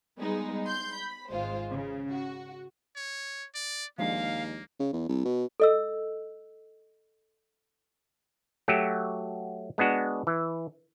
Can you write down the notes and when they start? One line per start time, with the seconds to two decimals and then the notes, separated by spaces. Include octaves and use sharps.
0.19 G3 G#3 B3 D#4 G#4
0.63 C6 G6
0.94 B5
1.29 G#1 G#3 F4 C5
1.70 C#3
2.10 F#4
2.96 C#5
3.55 D5
3.98 D#2 F3 G#3 A#3 D4 F5
4.80 C#3
4.93 E2
5.09 C2
5.25 B2
5.60 A4 D#5 E6
8.68 F#3 A3 F#4 G4
9.78 G#3 B3 D4 F#4
10.27 E3